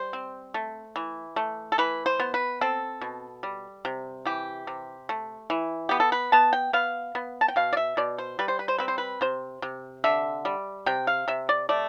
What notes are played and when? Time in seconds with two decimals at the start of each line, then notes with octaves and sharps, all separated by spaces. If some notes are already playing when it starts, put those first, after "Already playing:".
Already playing: G3 C5
0.13 C4
0.54 A3
0.96 E3
1.36 A3
1.72 A4
1.78 E3 B4
2.06 C5
2.20 B3
2.34 B4
2.61 C4 A4
3.01 B2
3.43 G3
3.85 C3
4.25 E3 G4
4.67 C3
5.09 A3
5.50 E3
5.89 B3 G4
6.00 A4
6.12 B4
6.32 B3 A5
6.53 G5
6.73 B3 F5
7.15 B3
7.41 A5
7.48 G5
7.56 B2 F5
7.73 D5
7.77 E5
7.97 B2 D5
8.18 C5
8.39 G3 B4
8.48 C5
8.59 B4
8.68 C5
8.78 C4 B4
8.88 C5
8.98 B4
9.21 C3 C5
9.62 C3
10.04 D3 E5
10.45 G3
10.86 C3 G5
11.07 F5
11.28 C3 E5
11.49 D5
11.69 A3 D5